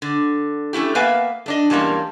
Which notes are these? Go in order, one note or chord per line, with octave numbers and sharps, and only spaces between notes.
D3
A3 C#4 E4 G4
A#3 B3 B4 E5 F5 G#5
A3 D4 D#5
E2 G3 G#3 A#3 C#4 A5